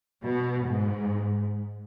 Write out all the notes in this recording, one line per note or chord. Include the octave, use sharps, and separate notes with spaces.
B2
G#2